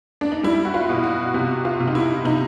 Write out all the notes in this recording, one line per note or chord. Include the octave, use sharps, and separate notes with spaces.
D4
D#4
G3 E4
F#4
F4
B2
F#4
C3 F#4
F4
C3
D#4
E4
C3 D#4